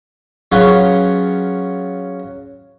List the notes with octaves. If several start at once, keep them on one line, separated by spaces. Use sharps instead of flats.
F#3 C#4 F4 G#4 B4